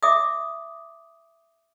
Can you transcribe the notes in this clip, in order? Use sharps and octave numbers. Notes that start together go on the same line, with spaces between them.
E5 D6 D#6